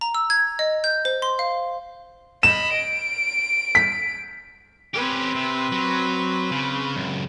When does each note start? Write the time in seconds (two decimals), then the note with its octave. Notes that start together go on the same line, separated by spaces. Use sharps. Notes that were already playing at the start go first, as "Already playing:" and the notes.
0.01 A#5
0.15 E6
0.30 G#6
0.59 D#5
0.84 G6
1.05 C5
1.22 C6
1.39 F5
2.43 D#5 B5 E7
2.74 D7
3.75 B6
4.94 C4 C#4 G4 B4
5.36 C3
5.72 F#3
6.52 C#3
6.96 C#2 F#2